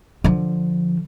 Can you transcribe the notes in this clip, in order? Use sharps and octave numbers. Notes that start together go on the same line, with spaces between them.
D3 F3